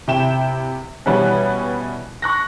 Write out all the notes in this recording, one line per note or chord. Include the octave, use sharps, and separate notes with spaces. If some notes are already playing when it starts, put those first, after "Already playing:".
C3 E4 G5 E7
B2 E3 G3 C#4 B4
C#6 F#6 A#6